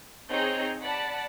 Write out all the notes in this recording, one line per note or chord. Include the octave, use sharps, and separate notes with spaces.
C4 D#4 G#4 C#5 G6
D5 F#5 A5 B5